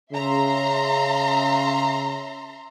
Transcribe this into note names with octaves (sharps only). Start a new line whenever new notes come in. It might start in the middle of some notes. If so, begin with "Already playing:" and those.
C#3 E5 A#5 C6